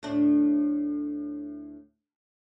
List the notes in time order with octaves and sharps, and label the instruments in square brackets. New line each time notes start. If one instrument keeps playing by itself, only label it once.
[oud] D2 A2 D4